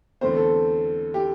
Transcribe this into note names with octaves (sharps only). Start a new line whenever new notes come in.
E2 D3 A3 C4 C5
A4
G4